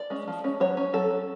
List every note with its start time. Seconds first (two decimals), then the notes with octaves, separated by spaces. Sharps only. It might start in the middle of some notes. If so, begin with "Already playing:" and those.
Already playing: D5
0.10 G#3 C#4
0.28 F3
0.44 G#3 C#4
0.60 F#3 C#5
0.77 C#4
0.93 F#3 A4
1.10 C#4